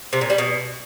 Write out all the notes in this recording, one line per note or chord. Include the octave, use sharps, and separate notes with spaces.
C3
A#2
G3
B2